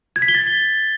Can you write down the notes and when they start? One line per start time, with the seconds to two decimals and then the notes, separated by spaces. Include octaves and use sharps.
0.16 G#6
0.22 B6
0.28 G7
0.35 A6